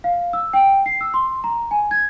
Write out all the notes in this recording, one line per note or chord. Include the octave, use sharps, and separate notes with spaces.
F5
E6
G5
C7
E6
C6
A#5
G#5
G#6